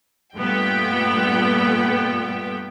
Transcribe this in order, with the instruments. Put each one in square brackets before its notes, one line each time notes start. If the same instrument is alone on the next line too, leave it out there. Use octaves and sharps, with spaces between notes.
[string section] G2 A#2 A3 B3 G5